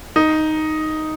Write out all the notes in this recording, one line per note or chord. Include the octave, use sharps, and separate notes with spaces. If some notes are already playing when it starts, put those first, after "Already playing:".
D#4